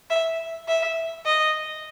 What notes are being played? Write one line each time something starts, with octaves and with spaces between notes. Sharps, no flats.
E5
E5
D#5